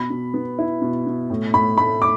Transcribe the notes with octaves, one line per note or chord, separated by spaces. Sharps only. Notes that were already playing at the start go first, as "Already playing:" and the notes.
Already playing: B2 B5
B2
B3
E4
B2
B2
A2
A2 B5
A3 B5
D6